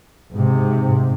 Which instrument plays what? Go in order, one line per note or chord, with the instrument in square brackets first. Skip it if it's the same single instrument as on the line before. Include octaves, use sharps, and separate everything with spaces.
[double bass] G#2 C3